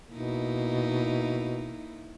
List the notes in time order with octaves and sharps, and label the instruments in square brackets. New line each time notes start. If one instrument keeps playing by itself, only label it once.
[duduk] B2 [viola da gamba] A#3 D#4 E4